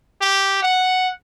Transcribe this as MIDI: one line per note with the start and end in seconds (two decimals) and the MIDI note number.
0.21 0.61 67
0.62 1.09 78